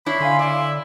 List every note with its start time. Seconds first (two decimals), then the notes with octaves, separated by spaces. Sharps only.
0.06 D4 E4 C#5 B5
0.21 D3 F5 G#5 C6
0.39 E4 D5